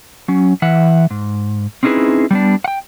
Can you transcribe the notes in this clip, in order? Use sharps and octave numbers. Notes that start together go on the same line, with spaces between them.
F#3 C#4
E3 E5 F#5
G#2
C4 C#4 D#4 E4 G#4 B4
G3 B3 D4
F#5 G5